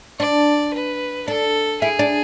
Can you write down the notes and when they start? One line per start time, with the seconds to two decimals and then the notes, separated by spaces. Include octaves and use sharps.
0.19 D4 D5
0.73 B4
1.28 D4 A4
1.81 E4 G#4
1.99 D4